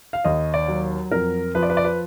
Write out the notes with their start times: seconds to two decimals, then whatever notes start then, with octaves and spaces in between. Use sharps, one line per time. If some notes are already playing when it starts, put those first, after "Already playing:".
0.13 F5
0.25 D#2 D#5
0.54 D5
0.68 F#3
1.12 F2 A#4
1.55 F3 B4
1.63 D5
1.70 B4
1.77 D5
1.85 B4